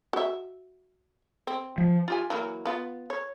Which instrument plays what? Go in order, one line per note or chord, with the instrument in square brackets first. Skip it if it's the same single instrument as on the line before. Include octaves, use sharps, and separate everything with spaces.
[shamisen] F#4 E5
C4
[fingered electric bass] F3
[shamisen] F4 G4 G#5
E3 F#3 A#3
B3 F4
C#5